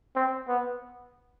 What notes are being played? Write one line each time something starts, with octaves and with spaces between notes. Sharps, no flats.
C4
B3